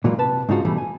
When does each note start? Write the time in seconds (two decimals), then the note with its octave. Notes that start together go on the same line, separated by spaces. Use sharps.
0.04 A#2 E3 F#3 G#3 A#3 F4
0.18 C3 B4 A5
0.49 G#2 C#3 D4 D#4 F4 F#4
0.65 E2 B2 E3 G3 A3
0.78 G#5